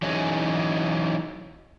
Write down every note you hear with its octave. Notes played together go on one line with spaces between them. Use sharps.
E3 F#3 C#4 D#4 G#4